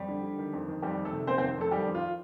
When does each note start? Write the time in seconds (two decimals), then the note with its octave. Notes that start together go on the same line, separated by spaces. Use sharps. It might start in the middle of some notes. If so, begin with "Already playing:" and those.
Already playing: F2 G3 G4
0.08 D3
0.23 D3
0.38 D#3
0.53 F2
0.68 D#3
0.82 F2 G3 G4
0.97 D#3
1.05 A3 A4
1.13 C3
1.27 D#3 C4 C5
1.38 C4 C5
1.42 F2
1.58 F2 A3 A4
1.71 D#3 G3 G4
1.87 F2
1.95 F4